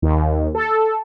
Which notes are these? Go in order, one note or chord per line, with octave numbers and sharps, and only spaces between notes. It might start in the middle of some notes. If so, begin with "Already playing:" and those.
D#2
A4